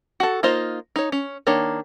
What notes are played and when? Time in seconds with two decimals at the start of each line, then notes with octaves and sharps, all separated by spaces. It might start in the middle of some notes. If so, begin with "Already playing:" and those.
0.20 F#4 A4
0.43 A#3 D#4 F4 C5 D#5
0.96 D#4 C#5
1.12 C#4
1.47 D#3 A#3 D4 C#5